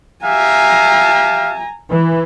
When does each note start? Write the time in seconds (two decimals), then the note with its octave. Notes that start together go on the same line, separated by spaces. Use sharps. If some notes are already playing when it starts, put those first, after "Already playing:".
0.25 G4 E5 F5 G#5 A#5
1.91 E3